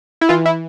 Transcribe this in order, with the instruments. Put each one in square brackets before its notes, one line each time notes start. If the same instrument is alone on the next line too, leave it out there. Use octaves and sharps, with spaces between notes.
[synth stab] E4
E3 F4
E4